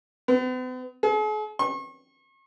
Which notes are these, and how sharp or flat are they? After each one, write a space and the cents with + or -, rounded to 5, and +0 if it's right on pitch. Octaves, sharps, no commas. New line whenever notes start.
B3 +45
G#4 +45
C#6 -40